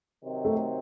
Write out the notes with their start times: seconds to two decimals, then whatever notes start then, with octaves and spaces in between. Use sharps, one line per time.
0.22 C3 D#3 F#3 C4 D#4
0.45 A3